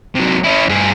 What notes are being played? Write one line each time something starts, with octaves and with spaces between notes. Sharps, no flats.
C3 F#3
C#4 E4
G2 G#4